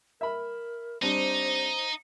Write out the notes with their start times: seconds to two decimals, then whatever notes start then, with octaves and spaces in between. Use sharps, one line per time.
0.21 A#4 E5 B5
1.02 G3 C4 D4 D#4 C5